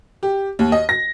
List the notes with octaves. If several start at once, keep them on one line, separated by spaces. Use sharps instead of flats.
G4
D#2
D#5
A#6